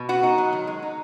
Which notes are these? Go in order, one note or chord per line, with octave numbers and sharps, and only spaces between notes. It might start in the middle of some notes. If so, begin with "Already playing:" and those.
Already playing: B2
B3 F#4
D#4
F#3
D#3
G#3
D#4